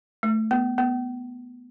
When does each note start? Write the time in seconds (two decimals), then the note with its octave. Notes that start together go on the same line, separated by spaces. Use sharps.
0.23 A3
0.51 B3
0.78 B3